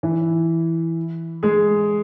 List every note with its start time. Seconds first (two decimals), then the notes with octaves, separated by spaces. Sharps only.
0.03 E3 E4
1.43 G#3 G#4